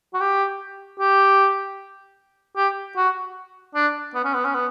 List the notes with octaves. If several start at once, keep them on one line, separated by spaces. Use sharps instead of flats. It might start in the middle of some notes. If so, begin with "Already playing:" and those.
F#4
G4
G4
G4
F#4
D4
B3
C#4
B3
C#4
B3